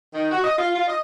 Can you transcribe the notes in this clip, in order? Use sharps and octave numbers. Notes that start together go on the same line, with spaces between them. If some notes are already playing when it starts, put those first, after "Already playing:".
D#3
F#4
D#5
F4
F4
D#5